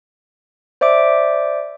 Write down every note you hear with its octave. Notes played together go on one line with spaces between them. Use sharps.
C5 D5 E5 D6 D7